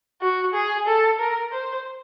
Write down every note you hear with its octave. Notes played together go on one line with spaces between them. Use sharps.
F#4
G#4
A4
A#4
C5